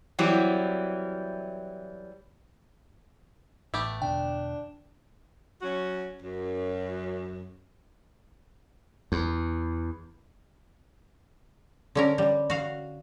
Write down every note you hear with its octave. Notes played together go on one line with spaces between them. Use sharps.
E3 F#3 G3 C4 E4
A1 A3 B3 G4
E2 B2 D3 D4 G5
F#3 C#4 F#4
F#2
E2
D3 C#4 A#4
G3
F#4 F5